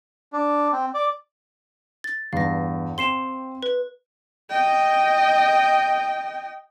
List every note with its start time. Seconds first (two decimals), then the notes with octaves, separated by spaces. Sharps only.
0.33 D4
0.72 C4
0.94 D5
2.04 A6
2.33 E2 G2 F5 A#6
2.98 C4 G5 C6 C7 E7
3.63 B4
4.50 D#5 G5